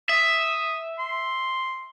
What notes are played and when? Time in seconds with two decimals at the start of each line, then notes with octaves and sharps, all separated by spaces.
0.09 E5 D#6
0.99 C6